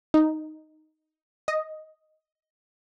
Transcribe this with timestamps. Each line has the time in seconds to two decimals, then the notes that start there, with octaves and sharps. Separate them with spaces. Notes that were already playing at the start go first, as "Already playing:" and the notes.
0.14 D#4
1.48 D#5